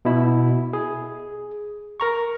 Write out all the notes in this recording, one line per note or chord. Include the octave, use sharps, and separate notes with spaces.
B2 E4
G#4
A#4 A#5 C#6